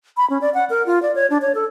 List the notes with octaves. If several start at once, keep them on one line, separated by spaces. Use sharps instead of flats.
B5
C#4
D5
F#5
A#4
F4
D5
C#5
D4
C#5
A4